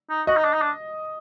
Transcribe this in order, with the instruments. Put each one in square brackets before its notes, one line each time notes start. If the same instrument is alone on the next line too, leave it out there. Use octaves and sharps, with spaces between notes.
[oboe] D#4
[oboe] F#4 [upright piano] D#5
[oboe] D#4
D4
D#4
D4